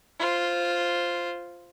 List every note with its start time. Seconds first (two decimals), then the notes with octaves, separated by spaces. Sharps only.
0.19 F4 C5